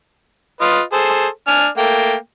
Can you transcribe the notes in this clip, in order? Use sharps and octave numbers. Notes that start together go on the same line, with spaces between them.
F4 B4 D#5
G#4 A4 C5
D4 G#5 F6
A3 A#3 G5